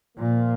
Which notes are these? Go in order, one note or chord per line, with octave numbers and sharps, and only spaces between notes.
A#2 F3 A#3 F4